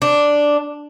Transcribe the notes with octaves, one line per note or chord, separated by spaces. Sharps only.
D4